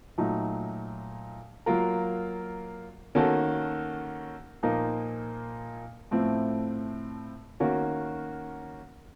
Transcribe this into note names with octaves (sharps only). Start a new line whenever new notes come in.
A#2 F#3 A3 D#4
F#3 A#3 F4 A#4
D#3 A#3 C#4 F#4 A4
A#2 F3 A#3 D#4
A2 F3 A3 C4
D#3 A#3 C#4 F#4